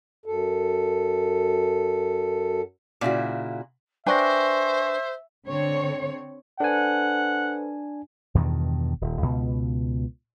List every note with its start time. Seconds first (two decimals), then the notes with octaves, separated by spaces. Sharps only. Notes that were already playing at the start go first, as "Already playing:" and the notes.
0.26 F#2 A4
3.01 A#2 C#3 E4 F#4
4.07 D4 B4 C5 E5 G5 G#5 C#6 A#6
5.47 D3 C4 C#5
6.60 D4 A4 B4 C5 F#5 G#5
8.35 E2 G2 B2 D#3
9.01 D#1
9.22 C#2 B2